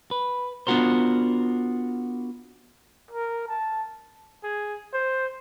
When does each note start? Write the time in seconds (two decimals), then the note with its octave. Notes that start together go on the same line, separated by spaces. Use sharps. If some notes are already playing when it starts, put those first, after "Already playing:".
0.11 B4
0.67 B3 D4 F4 F#4 A#4 C5
3.11 A#4
3.48 A5
4.43 G#4
4.93 C5